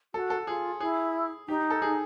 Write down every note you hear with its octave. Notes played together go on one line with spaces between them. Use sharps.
F#4 A4
A4
F4 G#4
E4 G#4
D#4 G4
A4
G#4